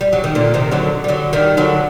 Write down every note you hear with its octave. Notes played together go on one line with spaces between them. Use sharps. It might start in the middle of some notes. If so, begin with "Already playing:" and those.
G3
F#3
D#3
A#2 D3
C3 D#3
D3 F#3
G3
D3 F#3
D#3 G3
D3 F#3